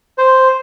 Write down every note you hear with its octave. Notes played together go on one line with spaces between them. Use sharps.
C5